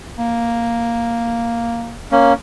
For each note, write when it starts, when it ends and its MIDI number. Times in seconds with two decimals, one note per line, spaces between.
0.18 2.00 58
2.12 2.33 58
2.12 2.33 61